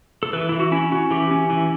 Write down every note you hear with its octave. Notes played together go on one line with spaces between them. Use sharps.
A4
E3 B4
E3 E4
F#4
C#4 E4
C#4 F#4
E3 G4
C#4
E3